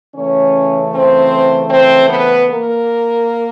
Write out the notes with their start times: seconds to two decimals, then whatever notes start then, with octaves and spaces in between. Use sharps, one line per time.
0.15 C#3 E3 A3 C#4 C#5
0.93 C4 C5
1.70 C4 C5
2.09 B3 B4
2.48 A#3 A#4